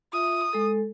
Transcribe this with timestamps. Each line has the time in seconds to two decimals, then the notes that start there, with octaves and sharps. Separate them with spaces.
0.13 F4 E5 D#6
0.53 G#3 A4